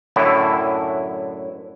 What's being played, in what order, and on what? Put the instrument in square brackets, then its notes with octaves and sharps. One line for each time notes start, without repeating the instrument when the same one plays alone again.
[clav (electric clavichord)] F#2 A2 D3 E4